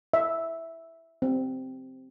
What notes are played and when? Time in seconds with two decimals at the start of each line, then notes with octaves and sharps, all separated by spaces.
0.14 E5
1.22 C4